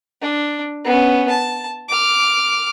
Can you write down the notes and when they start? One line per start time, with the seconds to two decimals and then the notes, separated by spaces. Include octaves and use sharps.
0.21 D4
0.84 B3 C#4
1.30 A5
1.89 D6 F6